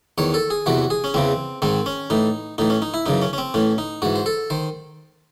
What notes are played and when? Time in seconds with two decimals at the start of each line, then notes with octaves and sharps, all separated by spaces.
0.18 E2 D#3 C#5
0.34 A4
0.50 G#4
0.66 E2 C3 E3 F#4
0.90 G#4
1.04 C#4
1.14 E2 C#3 E3 C4
1.62 G#2 D#3 C4
1.86 C#4
2.10 A2 E3 D#4
2.58 A2 E3 D#4
2.70 C#4
2.82 D#4
2.94 E4
3.06 F#2 C#3 E3 D#4
3.22 C#4
3.33 C#4
3.38 C4
3.54 A2 E3 C#4
3.78 D#4
4.02 G#2 E3 F#4
4.16 C5
4.26 A4
4.50 D#3 C5